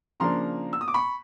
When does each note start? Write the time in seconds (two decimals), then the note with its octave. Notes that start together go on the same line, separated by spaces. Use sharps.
0.20 C#3 F3 A#3 D4 A#5 C6
0.73 E6
0.81 D#6
0.88 D6
0.94 B5 C#6